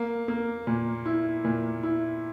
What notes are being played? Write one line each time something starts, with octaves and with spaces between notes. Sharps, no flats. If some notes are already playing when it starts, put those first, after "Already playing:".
Already playing: A#3
A#3
A#2
E4
A#2
E4